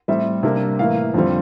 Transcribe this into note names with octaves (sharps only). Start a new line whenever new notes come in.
A2 G3 C4 E5
C3 G3 A#3 D4
A2 E3 A#3 F5
F2 D3 G3 C4